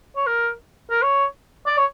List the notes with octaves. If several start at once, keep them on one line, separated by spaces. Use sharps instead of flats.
C#5
A#4
A#4
C#5
D5
C#5